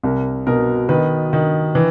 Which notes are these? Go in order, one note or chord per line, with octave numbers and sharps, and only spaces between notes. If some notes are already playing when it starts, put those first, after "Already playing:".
C2 A#4
B2 A#4
D#3 B4
D#3
E3